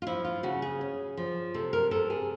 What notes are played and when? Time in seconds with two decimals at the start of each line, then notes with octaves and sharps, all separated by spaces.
0.02 F4
0.07 F3 E4
0.25 F4
0.43 C#3 F#4
0.62 G#4
0.81 C#4
1.17 F3
1.54 C3 A4
1.73 A#4
1.91 C3 A4
2.10 G#4